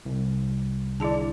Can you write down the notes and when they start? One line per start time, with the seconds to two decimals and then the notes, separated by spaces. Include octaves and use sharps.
0.05 C2
1.00 D3 E4 G#4 D5 A5